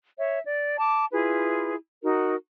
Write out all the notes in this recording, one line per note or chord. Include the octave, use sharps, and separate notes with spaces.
C#5 E5
D5
A5 D6
E4 F4 G#4 B4
D#4 F#4 A#4